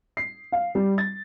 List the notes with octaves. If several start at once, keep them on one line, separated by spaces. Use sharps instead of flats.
C7
F5
G3
A6